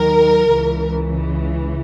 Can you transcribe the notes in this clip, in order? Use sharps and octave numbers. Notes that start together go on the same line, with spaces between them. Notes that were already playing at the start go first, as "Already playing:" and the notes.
Already playing: D#2 D#3 F#3 A#4
C#2 C#3 E3